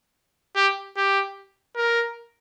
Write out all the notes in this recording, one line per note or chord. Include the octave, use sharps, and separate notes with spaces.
G4
G4
A#4